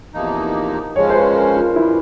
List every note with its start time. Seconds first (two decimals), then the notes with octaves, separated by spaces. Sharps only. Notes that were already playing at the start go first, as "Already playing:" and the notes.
0.14 E2 C3 F3 A#3 D#4
0.96 C#3 F3 G#3 C#4 C#5
1.10 C5
1.15 B4
1.36 A#4
1.57 F4
1.76 C3 D#3 G3 E4